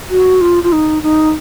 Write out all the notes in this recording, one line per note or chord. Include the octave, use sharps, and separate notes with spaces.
F#4
F4
F4
D#4
D#4